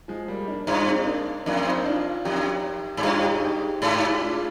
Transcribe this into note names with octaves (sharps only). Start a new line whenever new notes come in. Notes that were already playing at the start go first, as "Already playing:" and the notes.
F3 G#3
G3 A#3
A#3 D4
G2 D4 F4
C4 D#4
A#3 D4
F2 A#3 D4
C4 D#4
D4 F4
F2 D#4 G4
G#2
G2 D4 F4
G4
G#4
D#4 G4
G#2 F4 G#4
D#4 G4
F4 G#4
D4 F4